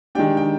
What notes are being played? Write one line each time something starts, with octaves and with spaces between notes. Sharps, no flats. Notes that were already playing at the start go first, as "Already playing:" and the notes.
D#3 G#3 D4 G4 G5
G5